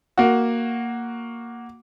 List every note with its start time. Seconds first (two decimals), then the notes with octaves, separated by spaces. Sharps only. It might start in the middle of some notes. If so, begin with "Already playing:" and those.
0.18 A#3 F#4